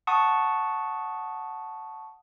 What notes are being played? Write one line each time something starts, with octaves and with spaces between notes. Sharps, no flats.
F#5 A5 C#6 D#6